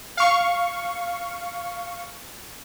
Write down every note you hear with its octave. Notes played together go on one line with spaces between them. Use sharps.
F5 C#6